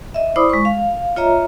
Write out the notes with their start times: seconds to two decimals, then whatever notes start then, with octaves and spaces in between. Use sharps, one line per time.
0.14 D#5 E5
0.36 E4 C5 D5 B5 D6 D#6
0.49 G#3 C#6
0.65 F5
1.16 F4 C#5 D#5 E5 A#5